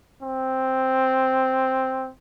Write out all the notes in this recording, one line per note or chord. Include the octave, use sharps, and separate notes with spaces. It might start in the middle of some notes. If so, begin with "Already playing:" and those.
C4